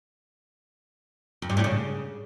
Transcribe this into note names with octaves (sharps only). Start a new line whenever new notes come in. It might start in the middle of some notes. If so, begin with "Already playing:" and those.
F2
G2
A2
C#3